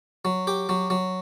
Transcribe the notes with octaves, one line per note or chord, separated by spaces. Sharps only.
F#3
G4
F#3
F#3